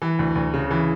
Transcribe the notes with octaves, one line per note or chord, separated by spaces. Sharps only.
E3
D2
D2
C#3
E3